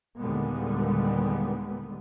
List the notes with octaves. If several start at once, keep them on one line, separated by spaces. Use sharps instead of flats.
D#2 A#2 D3 G3 G#3 B3